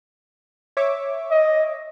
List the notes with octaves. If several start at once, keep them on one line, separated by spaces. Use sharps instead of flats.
C#5 E5 D6
D#5